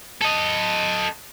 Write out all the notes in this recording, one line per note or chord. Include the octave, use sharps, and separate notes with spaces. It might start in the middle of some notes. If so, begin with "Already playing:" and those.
A4 D#5